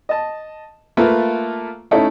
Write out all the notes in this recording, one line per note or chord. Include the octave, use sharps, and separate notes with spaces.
D#5 A5
A3 A#3 F4 A4 B4
A3 C#4 D#4 E4 A4